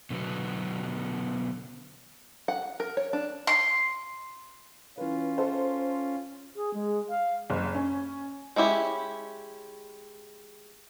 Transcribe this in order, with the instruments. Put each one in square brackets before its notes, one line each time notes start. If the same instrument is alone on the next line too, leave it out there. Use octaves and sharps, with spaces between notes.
[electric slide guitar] B2 D3 F#3 B3
[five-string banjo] F#5
A#4
C#5
D4
[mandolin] C6
[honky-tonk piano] E3 B4 [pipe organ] C#4 F4
[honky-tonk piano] A4 C5
[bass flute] G#4
G#3
F5
[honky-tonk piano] F#1
C#4
[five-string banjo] G#3 C#4 E4 G4